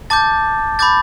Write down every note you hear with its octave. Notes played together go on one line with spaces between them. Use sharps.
A5 D6 G6 A6
B5 D6 G6 A6